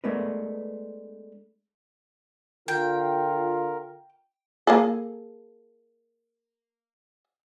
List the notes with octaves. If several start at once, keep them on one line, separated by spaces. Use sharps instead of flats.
G#3 A3 B3 D4 A#4 B4
D3 F4 A#4 G5
A#3 G#4 A4